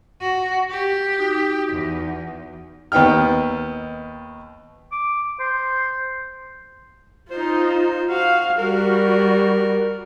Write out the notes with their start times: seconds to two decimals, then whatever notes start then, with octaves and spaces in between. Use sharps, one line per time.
0.21 F#4
0.70 G4
1.19 D#4 F#4
1.72 E2
2.92 D#2 B3 D#4 G5 F6
4.92 D6
5.40 C5
7.31 D#4 F4 C5
8.10 F#4 F5
8.58 G3 F#4 A#4